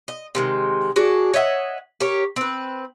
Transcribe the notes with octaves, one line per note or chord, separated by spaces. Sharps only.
D#5
C3 D#3 G#3
D4 F#4 G#4 D5
C#5 D#5 E5 F#5
G4 A#4 C#5
C4 B4